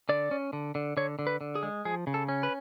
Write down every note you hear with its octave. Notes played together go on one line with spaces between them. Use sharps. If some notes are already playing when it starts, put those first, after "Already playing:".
D3 D5
C#4
D3
D3
D3 C#5
D3
B4
D3
G#4
G#3
F3 G#4
C#3
A4
C#4
B4